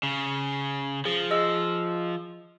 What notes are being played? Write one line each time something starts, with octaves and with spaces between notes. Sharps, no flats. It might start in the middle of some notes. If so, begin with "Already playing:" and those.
C#3
F3 G#4
G#4 D#5 E6